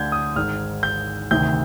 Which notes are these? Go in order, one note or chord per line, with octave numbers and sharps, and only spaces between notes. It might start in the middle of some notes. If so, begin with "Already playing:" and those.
Already playing: D2 D3 G6 G#6
D#6
G#1 G#2 D#3 F6
G6
D2 C3 D#3 G6